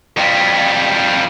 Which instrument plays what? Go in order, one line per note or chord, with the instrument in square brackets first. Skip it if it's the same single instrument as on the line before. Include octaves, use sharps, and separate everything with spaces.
[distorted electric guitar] F2 G3